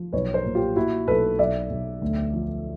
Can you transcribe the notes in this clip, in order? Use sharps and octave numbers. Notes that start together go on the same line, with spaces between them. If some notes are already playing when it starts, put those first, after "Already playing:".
Already playing: F3
B1 B4 C#5
A#4 C5
A#2
F4 G4
A#2 E4 F#4
B1 A4 B4
B1 D5 E5
B1
D2
F3